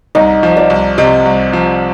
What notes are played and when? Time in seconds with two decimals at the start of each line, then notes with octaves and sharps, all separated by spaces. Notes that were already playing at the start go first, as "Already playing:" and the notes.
0.15 C2 D#4
0.43 F3
0.57 D5
0.70 C2
0.98 C3 D#5
1.25 C2
1.53 F3